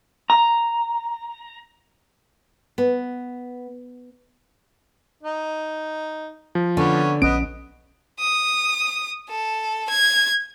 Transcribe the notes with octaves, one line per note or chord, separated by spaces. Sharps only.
A#5
B3
D#4
F3
D3 B3 C#4
A#1 B3 C#4 D#5 F#5 D7
D#6
A4
G#6